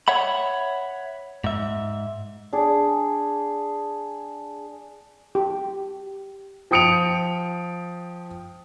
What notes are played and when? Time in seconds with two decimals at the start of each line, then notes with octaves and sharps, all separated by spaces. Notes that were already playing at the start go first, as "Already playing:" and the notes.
0.08 C#5 E5 F#5 B5
1.44 G#2 E5
2.53 D4 G#4
5.35 G4
6.71 F3 G5 D#6 C#7 D7 F7